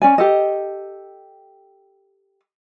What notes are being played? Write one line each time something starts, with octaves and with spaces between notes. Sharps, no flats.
C#4 D5 G#5
G4 A4 D#5